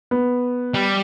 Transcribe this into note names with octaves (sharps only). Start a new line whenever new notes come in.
B3
G3